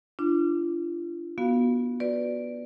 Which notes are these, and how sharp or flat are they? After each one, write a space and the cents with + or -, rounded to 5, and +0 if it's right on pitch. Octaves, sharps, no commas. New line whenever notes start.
D4 +0 F4 -35
B3 -20 F#4 +0 F5 +0
F#4 +0 B4 +0 D5 +0